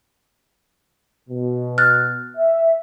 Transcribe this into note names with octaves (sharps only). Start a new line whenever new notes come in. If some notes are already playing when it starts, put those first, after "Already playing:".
B2
F6 F#6 A6
E5